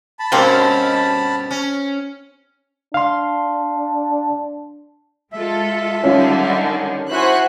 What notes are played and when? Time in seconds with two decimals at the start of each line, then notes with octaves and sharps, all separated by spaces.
0.19 A5 B5
0.32 G2 B2 G3 A#3 C4 C#4
1.51 C#4
2.94 D4 F5 C6
5.33 G#3 F4 A4 E5
6.03 D3 D#3 G3 C#4 F4
7.11 E4 F#4 C5 F#5 G#5 B5 F#6